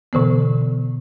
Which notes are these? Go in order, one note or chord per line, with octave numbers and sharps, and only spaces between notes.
B2 D3 E3 B3